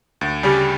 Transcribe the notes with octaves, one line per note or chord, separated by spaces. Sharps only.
D2
C#3 G3 C#4 G4